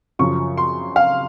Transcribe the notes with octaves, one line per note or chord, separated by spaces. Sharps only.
F#2 C#3 F3 C#6
C6
F5